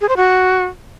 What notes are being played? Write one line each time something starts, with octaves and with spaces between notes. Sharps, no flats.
G#4
C5
F#4